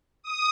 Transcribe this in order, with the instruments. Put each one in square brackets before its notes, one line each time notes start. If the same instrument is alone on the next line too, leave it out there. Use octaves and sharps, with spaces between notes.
[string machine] D#6